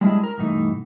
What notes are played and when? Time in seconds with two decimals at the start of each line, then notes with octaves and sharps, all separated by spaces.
0.01 G3 G#3 D4 E4 G#4 D#5
0.23 A#4
0.38 G2 B2 E3 A3 D#4